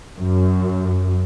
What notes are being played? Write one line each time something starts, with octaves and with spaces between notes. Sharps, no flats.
F#2